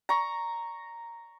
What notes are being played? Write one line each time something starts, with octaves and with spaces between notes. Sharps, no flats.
A#5 C#6